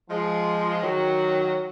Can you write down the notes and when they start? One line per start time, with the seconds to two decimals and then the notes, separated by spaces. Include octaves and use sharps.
0.10 F3 G#3
0.81 D#3 F#3